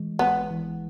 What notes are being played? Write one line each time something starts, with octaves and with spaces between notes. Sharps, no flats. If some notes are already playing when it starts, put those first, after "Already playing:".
Already playing: E3 G#3
G#1 B3
E3